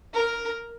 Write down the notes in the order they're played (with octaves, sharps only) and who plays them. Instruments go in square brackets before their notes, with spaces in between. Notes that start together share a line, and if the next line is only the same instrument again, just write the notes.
[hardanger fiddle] A#4